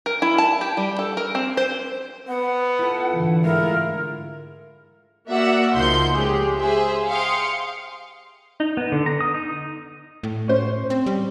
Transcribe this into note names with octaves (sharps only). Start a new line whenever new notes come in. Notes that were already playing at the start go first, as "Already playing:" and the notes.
A#4
E4
A5
G4
G3
A4
A#4
C4
C5
B3 F#5
E4 F4 A4
G#2 D3 E3
G#3 A3 E4 F4 A#4
A#3 F#4 D5 E5 F#5
C#2 F3 A#3 D#4 C6 G6
C#3 G#3 G4 G#4
G#4 C5 E5
F5 G5 C6 D#6 C#7
D#4
B3
D3
A#5
D#6
D#4
A2
C#4 C5
C4
G3